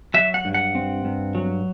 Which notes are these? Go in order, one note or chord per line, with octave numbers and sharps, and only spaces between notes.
F#3 E5
F#5
G2
F#5
C4
G2
F#3